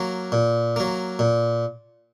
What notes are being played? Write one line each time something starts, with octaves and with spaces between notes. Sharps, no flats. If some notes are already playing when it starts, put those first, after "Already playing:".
Already playing: F#3 A#3
A#2
F#3 A#3
A#2